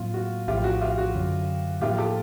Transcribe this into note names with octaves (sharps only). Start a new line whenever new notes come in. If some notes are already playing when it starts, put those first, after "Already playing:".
Already playing: A2 F#3 A#3 F4
F#4
A#1 A2 F3 F4 G4
F#4
F4 G4
F#4
F#2 D3 F#3
A2 F3 A#3 D#4 F4 G4
G4 A4